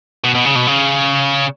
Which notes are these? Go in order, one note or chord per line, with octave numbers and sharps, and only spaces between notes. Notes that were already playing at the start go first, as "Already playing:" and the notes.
B2
B2
C#3
B2
C#3